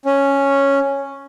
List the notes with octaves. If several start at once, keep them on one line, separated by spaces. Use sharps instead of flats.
C#4